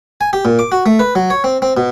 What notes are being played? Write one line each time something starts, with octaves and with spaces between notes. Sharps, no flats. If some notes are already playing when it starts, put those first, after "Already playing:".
G#5
G4
A#2
D6
F#4
A3
B4
F#3
C#5
C4
C4
B2